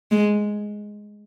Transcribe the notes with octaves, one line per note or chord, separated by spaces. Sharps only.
G#3